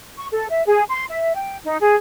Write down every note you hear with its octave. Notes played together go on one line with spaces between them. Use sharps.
C#6
A4
E5
G#4
C6
E5
G5
D#4
G#4